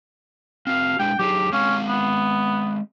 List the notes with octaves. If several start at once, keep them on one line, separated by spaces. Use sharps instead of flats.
C4 F#4 F5
G#3 D4 G5
F#3 D#4 G4 G#4
G#3 C4 C#4 F5
B3